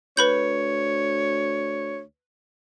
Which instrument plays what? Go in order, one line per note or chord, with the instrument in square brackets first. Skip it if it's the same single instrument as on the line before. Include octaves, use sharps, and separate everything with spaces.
[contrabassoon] D2 [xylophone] B4 B5 G6 [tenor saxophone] C#5